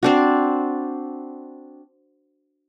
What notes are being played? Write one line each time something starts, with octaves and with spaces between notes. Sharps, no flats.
C4 D4 F#4